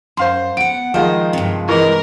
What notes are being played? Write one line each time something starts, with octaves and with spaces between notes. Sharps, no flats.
F#2 C5 F5 C6
B3 F#5 D7
D#3 F3 G#3 C5 D#5
G2 C3
E3 G#3 A#4 C#6